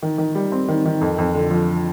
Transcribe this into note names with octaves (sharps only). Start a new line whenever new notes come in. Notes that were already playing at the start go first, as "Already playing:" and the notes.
D#3
D#3
G3
C4
D#3
D#3
F2
F2
D3
F3